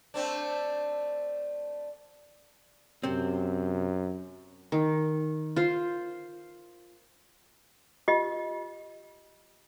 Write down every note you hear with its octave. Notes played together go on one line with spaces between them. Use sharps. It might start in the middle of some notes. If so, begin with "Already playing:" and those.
A3 C4 D4
F#2 C3 C4
D#3
F4 C5
F4 G4 D#5